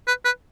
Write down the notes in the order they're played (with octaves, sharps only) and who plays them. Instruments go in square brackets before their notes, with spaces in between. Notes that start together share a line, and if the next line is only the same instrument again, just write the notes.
[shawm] B4
B4